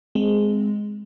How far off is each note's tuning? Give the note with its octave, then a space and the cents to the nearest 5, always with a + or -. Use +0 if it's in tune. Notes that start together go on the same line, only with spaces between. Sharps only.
G#3 +0 C4 -10